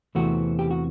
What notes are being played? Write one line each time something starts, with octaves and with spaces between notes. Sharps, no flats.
E2 C3 E3 A3 C4 F#4
G4
F#4